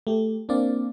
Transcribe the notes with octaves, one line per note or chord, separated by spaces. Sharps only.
A3 G4
A#3 C4 D4 D5 F5